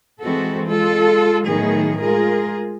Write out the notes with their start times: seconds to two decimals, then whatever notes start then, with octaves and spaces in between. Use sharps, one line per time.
0.21 E3 G#3 C4 F#4 A4
0.67 G#3 F4 A4
1.47 A2 D#3 F#3 B3 G#4
2.01 G#3 F4 G#4 A#4